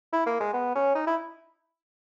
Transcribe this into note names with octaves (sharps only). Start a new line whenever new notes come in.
E4
A#3
G#3
B3
C#4
D#4
E4